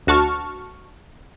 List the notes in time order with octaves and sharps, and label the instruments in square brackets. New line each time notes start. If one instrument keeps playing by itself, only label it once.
[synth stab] D2 F#4 A5 C#6 F6